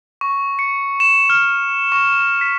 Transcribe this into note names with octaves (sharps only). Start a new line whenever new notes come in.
C#6
C#7
E7
F6
C#6
B6